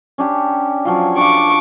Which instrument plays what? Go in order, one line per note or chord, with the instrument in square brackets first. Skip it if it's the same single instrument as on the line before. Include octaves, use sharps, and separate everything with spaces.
[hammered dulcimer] C#4 D4 G4
F3 F#3 F4
[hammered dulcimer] D4 F4 [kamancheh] C#6 D6